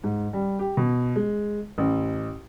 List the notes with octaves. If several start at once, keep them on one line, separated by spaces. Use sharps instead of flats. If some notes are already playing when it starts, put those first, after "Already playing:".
G#2
G3
G4
B2
G#3
A1